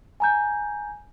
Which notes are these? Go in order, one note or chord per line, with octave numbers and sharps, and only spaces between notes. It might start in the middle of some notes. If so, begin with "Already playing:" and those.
G#5 A#5 G6